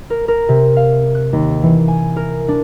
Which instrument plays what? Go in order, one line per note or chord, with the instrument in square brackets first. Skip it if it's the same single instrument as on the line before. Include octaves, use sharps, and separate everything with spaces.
[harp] A#4
A#4
C3
F5
F#6
D#2
E3
G#5
A#4
D4